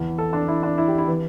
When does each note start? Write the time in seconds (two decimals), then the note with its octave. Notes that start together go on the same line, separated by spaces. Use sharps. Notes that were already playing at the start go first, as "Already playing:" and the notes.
Already playing: E2 E3
0.18 A4
0.33 D4
0.48 E4
0.63 D4
0.78 E4
0.88 G4
0.98 E4
1.08 E3